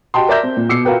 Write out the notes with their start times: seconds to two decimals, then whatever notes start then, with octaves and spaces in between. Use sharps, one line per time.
0.14 F#4 G4 D#5 G5 A5 C6
0.28 A#4 D5 E5 G6 A#6
0.43 C4
0.57 A#2
0.69 B2 D6 E6 C7 C#7
0.85 F4 F#4 A#4 B4 G5